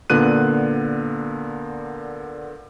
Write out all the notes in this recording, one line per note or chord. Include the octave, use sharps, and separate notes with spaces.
A#2 D3 B3 F#6 D#7